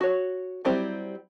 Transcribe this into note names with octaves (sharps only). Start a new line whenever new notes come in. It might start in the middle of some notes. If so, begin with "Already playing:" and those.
F#4 C#5
F#3 G3 C4 E4 G4